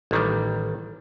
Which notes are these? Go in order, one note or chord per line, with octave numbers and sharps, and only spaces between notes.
A1 D#3 G3